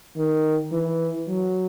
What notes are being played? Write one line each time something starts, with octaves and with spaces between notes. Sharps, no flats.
D#3
E3
F#3